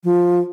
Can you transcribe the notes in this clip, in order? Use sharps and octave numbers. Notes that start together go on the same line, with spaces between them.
F3